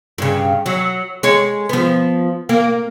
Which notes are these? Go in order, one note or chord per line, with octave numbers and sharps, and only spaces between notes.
G2 C#3
F#3
G#3 C#5
F3 B3
A#3